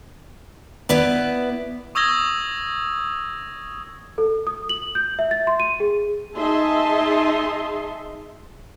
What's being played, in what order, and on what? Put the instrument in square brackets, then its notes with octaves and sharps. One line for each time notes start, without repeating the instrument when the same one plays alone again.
[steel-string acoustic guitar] B3 E4 B4 D5
[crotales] C#6 D#6 E6 G#6 A#6 G7
[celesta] A4
D#6
F#7
G6
E5
A6
C6
D#7
G#4
[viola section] D#4 G#4 D#5 E5 A5 C6